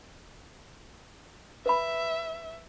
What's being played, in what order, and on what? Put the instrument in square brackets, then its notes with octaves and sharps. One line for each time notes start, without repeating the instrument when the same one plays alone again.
[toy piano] B4 B5 [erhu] E5